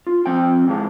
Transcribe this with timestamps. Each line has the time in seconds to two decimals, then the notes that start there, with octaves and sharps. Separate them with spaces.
0.07 F4
0.26 F3 C4 F4 A4 G5
0.67 G#2 E3 G#4 F5 A5